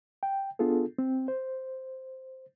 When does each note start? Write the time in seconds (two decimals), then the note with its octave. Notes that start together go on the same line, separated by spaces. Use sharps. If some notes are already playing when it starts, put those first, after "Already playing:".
0.23 G5
0.59 B3 D4 F4 G#4 A4
0.99 C4
1.28 C5